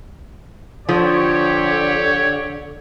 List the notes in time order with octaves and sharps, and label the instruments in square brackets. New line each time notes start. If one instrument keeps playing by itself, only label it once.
[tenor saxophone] D3 [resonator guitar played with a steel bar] F3 [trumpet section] G4 C#5